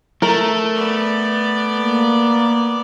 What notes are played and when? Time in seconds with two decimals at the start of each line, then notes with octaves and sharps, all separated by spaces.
0.22 A3 A#4
0.75 B3 D5
1.78 A#3